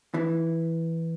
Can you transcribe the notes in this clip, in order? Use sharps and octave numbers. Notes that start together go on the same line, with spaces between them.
E3